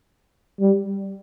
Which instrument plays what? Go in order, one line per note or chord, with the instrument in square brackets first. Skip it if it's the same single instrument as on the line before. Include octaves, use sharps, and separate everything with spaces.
[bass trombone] G3